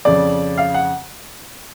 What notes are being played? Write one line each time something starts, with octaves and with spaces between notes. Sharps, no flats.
F2 C#3 D5
F5
F#5